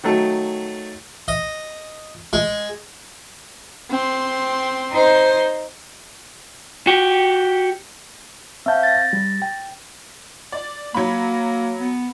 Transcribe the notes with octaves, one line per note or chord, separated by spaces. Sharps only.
D#3 F#3 A3
D#5
G#3
C4 C6
D#4 C5
F#4 G4
C4 E5 F5 A5 G6
A6 A#6
G3
G5
D5
F#3 A#3 B5
B3